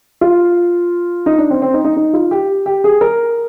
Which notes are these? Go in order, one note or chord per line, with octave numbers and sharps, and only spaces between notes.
F4
D#4
D4
C4
C4
D#4
D#4
D#4
F4
G4
G4
G#4
A#4